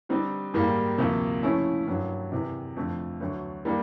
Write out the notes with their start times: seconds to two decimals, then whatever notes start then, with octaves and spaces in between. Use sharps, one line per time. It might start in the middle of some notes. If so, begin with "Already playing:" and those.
0.09 D3 G3 C4 D#4
0.54 G#2 D#3 G3 A#3
0.98 D2 C3 F3 A#3 D#4
1.43 C#3 F3 A3 C#4 E4
1.87 G2 D#3 F#3
2.32 E2 C3 D#3
2.76 F2 D3 F3 A3
3.20 D2 D3 F#3
3.65 D#3 G3 A#3 D4